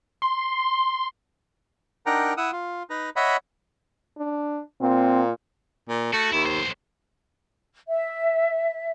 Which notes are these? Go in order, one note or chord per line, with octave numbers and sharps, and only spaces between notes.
C6
D4 D#4 A#4 F#5 G5 A#5
E4 F#5 D#6 E6
F4
D#4 B4 A#5
C#5 D#5 E5 F#5 B5
D4
A#2 C4
A#2
A3 F#4
D#2 E4
B1 C5
E5